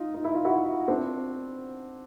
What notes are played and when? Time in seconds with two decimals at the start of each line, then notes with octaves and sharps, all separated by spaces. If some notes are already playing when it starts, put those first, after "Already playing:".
Already playing: D#4 F4
0.14 D#4
0.24 E4
0.34 F4
0.45 E4 F#4
0.88 C4 D4